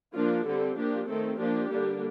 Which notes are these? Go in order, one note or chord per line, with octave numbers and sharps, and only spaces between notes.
F3 A#3 D4 F4
D3 G3 C4 A4
F3 A#3 D4 G4
D#3 A3 C4 A4
F3 A#3 D4 G4
D3 G3 A#3 D4